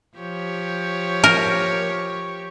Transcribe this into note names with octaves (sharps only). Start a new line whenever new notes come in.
F3 G4 C#5
A#4